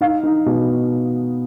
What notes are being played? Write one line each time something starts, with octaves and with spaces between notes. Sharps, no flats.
D#4 F5
D#4
B2